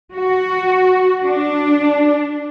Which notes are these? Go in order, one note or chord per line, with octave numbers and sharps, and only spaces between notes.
F#4
D4